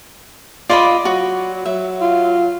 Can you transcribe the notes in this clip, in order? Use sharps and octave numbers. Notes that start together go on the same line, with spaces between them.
F4 D5 D#5 B5
F#3 F#4
F#3 E5
F4